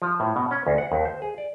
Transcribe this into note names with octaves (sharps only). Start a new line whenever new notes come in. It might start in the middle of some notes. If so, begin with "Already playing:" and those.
F3
A2
B2
C#4
D2
F#5
D#2
C5
G#4
D5